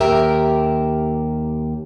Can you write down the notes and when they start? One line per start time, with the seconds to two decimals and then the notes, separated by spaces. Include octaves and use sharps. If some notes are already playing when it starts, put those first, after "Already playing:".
0.01 D#2 G4 A#4 E5